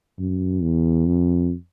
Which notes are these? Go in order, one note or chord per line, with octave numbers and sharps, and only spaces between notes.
F#2
E2
F2